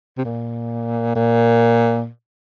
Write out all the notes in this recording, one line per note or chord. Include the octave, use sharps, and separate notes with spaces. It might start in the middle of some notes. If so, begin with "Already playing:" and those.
C3
A#2
A#2